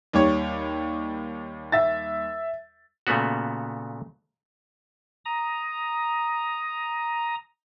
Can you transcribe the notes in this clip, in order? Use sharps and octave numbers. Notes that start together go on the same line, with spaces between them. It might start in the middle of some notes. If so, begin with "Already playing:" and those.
D#2 G3 C#5
E5 A6
A#2 C#3 A3 B3 F#4
A#5 D#6